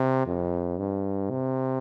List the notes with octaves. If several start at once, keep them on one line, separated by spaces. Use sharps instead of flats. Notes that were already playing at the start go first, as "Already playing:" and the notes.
Already playing: C3
F2
G2
C3